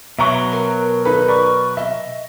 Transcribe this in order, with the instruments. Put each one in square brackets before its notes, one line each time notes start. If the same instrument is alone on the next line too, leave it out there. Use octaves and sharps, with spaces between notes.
[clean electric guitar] B2 F#3 [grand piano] E5 A#5 C#6
[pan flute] A#4
[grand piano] D#3 D#4 B4 [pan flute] A4
[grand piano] A#4 B4 D5 [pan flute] C#6
[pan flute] D#5 [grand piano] E5